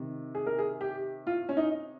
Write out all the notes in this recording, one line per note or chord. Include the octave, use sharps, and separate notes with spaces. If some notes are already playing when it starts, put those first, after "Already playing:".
Already playing: C3 D#3
G#4
A#4
G#4
G4
F4
C#4
D#4